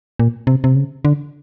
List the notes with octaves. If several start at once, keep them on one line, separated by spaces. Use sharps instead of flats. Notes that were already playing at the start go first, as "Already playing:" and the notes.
A#2
C3
C3
C#3
D3